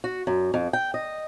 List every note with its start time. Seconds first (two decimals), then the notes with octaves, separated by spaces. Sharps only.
0.04 F#4
0.27 F#2
0.54 F2
0.73 G5
0.94 D#5